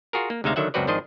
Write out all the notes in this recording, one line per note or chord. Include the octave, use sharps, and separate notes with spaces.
F4 F#4 G#4 A#4
A#3
D2 C3 G#3 D#4 E5 F5
D3 D#3 F#3 E5 F#5
C#2 F#2 C4 F#4 B4 D5
G#1 D#3 F3 D4 C5 D#5